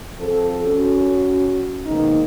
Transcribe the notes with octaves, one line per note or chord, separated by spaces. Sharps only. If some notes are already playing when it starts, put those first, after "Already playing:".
F3 C4 A4
C#4 F#4
G#2 B2 D#3 A#3 D#4